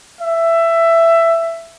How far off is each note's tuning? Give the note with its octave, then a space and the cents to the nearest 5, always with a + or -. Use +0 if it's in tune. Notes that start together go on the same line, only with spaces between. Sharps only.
E5 +15